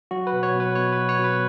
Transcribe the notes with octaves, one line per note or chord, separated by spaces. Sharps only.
F#3 F#4
B4
B2
C#5
B2
B4
B2 C#5
F#3 B4
C#5
B2 B4